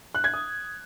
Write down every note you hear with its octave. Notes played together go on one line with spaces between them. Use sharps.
F#6
G#6
D#6